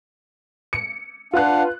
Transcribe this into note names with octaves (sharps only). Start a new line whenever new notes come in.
C#7
D4 F4 B4 F5 F#5 F#6